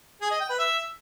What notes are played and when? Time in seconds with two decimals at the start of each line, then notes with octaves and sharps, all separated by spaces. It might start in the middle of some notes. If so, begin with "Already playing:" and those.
0.21 G#4
0.31 D#5
0.40 G5
0.50 B4
0.59 E5